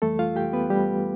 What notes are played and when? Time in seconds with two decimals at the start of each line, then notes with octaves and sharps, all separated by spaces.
0.02 F2 E3 G3 A3 A4
0.19 F4 F5
0.36 G4 G5
0.53 B3 B4
0.70 G3 G4